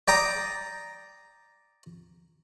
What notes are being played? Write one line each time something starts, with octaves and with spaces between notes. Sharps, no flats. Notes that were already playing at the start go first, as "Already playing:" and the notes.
D5 G5 A#5 D#6